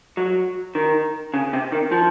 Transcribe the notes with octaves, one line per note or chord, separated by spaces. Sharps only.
F#3
D#3
C#3
C3
D#3
F3